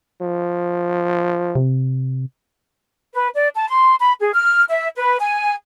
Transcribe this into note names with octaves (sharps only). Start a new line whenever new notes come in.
F3
C3
B4
D5
A5
C6
B5
G#4
F6
E5
B4
G#5